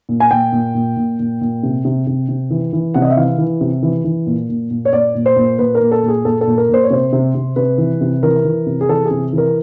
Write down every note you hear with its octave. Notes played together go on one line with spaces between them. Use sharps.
A#2
G#5
A#2 G5
A#2
A#2
A#2
A#2
A#2
C3
C3
C3
C3
E3
E3
C3 F#5
D#5
E5
E3 F5
E3
C3
E3
E3
A#2
A#2
A#2
C#5
A#2 D5
A#2
C5
A#2
A#2 B4
A#4
A#2
A4
A#2
G#4
A#2 A4
A4
A#2
A#4
A#2 C5
C#5
C3 C5
C3
C3
C3 B4
E3
C3
E3 A#4
E3
C3
G#4
E3 A4
G#4
C3
E3
A#4